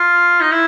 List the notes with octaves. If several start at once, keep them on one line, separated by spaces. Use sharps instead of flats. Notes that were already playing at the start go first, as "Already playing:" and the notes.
Already playing: F4
D#4
E4